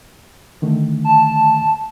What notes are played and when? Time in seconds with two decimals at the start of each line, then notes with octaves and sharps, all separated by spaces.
0.62 D3 D#3 A3
1.05 A5